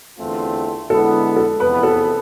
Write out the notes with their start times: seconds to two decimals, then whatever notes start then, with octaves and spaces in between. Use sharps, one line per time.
0.19 E2 D3 A3 C4 F4
0.90 D3 G#3 B3 E4 A4
1.37 A4
1.60 E2 C3 F3 B3 B4
1.83 A4